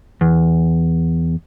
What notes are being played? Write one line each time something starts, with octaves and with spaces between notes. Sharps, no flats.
E2